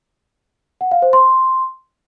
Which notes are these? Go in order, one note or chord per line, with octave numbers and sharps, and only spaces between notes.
F#5
F5
C5
C6